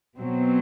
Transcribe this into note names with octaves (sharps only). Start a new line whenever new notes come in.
B2 F#3 C4